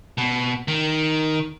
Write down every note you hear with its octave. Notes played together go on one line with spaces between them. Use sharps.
B2
D#3